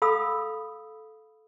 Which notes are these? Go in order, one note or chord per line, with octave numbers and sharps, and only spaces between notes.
A4 F5 B5 D#6 E6